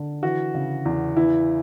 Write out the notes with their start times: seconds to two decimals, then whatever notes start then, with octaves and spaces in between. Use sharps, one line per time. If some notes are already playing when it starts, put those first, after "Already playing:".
Already playing: D3
0.22 E3 F#4
0.55 C#3
0.85 E2
1.16 E3 E4